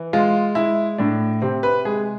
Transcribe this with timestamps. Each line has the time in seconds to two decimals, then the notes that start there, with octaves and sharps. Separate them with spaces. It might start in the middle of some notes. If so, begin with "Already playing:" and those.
Already playing: E3
0.13 G#3 F4
0.55 G#3 E4
0.98 A2 D4
1.42 C3 C4
1.63 B4
1.85 G#3 G#4